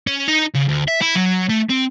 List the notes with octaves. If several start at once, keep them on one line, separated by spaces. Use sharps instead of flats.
C#4
D#4
C#3
D2
E5
E4
F#3
A3
C4